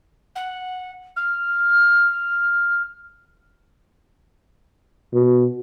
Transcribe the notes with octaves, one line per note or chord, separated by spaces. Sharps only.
F#5
F6
B2